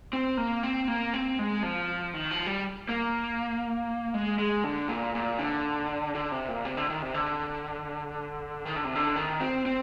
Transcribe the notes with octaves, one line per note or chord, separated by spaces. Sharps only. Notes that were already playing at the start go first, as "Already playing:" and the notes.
C4
A#3
C4
A#3
C4
G#3
F3
D#3
F3
G3
A#3
G#3
G#3
D3
A#2
A#2
D3
D3
C3
A#2
C3
D3
D#3
C3
D3
D#3
D3
C3
D3
D#3
C4
C4